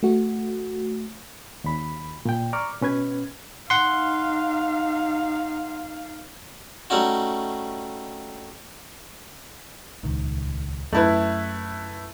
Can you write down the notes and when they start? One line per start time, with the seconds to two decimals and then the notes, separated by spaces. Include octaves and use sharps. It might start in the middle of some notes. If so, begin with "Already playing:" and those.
0.03 A3 F#4
1.64 D#2 B5
2.25 A#2 G5
2.53 D5 A#5 C#6 D6 F6
2.81 B2 C#4 B4 G#6
3.70 D#4 F5 F#5 C6
6.90 G3 A3 C#4 D#4 F#4
10.03 D#1 C#2 D#3
10.93 F#2 A3 E4 B4